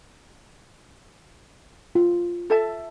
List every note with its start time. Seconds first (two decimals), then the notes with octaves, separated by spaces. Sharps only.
1.95 F4
2.50 A4 E5 A5